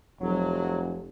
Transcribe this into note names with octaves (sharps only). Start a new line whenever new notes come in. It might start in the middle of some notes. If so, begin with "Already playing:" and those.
F1 F#3